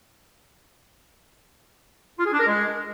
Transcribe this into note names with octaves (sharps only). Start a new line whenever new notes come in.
F4
G#4
D4
A#4
G#3